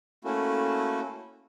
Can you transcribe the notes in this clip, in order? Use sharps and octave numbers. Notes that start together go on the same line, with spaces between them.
A3 A#3 C#4 E4 F#4 A4